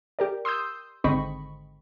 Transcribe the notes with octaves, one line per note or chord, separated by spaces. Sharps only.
G4 A#4 D5
C6 D#6 E6 G6
G#1 D3 C4 D#5 B5 C#6